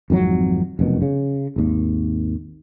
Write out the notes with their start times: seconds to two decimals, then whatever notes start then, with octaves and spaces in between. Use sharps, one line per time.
0.10 G#1 F2 D3 F#3
0.79 F1 F#2 B2
1.02 C#3
1.56 G#1 D#2